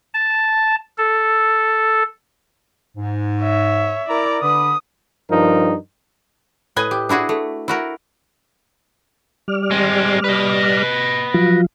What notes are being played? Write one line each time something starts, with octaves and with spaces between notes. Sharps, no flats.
A5
A4
G#2
C#5 E5
E4 A#4 D5 A#5
D3 D4 B4 D#6
G2 F3 D#4 A#4
A2 B4 D#5 G#5
G4
D4 E4 F#4 G#4
A3
E4 F#4 A#4
G3 D5 F6
G#3 C4
B4 D#5
F3 F#3 F4